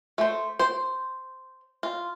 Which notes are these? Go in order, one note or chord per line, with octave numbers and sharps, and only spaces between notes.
A3 C5
C5
F4